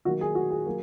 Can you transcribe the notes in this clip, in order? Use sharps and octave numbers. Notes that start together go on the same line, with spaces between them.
D#3 F#3 A#3 F#4
G#4
F#4
G#4
F#3 A#3